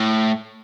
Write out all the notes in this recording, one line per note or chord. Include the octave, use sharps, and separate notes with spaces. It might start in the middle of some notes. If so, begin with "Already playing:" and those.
Already playing: A2